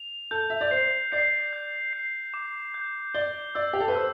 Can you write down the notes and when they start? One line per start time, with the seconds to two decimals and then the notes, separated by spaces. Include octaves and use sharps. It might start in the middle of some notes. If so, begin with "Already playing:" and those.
Already playing: F7
0.31 A4 G6
0.50 E5
0.61 D5
0.71 C5 C7
1.12 D5 C7
1.53 G6
1.93 C7
2.34 D6
2.74 G6
3.14 D5 G7
3.55 D5 E6
3.73 G4
3.80 A4
3.88 B4
3.96 C5 E6